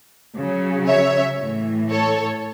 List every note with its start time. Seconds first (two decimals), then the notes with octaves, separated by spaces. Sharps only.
0.37 C#3 F#3
0.88 C#5 E5
1.39 A2 E3
1.91 A4 C#5